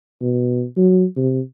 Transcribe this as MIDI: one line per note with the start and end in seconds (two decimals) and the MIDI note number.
0.21 0.64 47
0.77 1.05 54
1.16 1.41 48